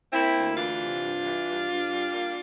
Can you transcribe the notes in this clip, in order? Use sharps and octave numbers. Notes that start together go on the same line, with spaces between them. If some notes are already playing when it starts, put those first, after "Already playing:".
A#3 C4 E4
D2
E3 D4 F4
C3
G2
E3
G2
G2
G3
A#3